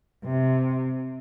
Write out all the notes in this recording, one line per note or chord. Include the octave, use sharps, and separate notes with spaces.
C3